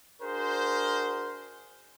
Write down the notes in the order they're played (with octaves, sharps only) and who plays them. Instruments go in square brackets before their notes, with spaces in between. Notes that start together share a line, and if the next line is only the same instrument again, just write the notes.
[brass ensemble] D4 F#4 G#4 A#4 C5